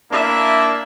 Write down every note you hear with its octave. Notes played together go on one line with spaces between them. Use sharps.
A#3 D4 E4 E5